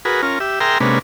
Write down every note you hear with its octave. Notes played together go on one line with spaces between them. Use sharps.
F#4 G#4 A#4 B4
C#4 F4 A#4
G4 E5
G#4 A#4 E5 G5 A#5 C6
C3 G#3 A#3 C#4 D4 B4